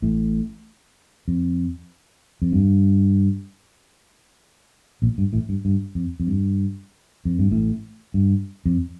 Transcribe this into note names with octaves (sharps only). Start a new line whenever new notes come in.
A1 A2
F2
F2
G2
A#1 A#2
G2
A1 A2
G2
G2
F2
F2
G2
F2
G2
A1 A2
G2
F2